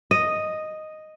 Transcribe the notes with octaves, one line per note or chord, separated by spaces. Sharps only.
D#5